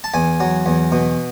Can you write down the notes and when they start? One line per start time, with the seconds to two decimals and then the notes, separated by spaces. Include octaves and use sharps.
0.04 A5
0.14 E2 G#5
0.40 F#3
0.66 E2
0.92 B2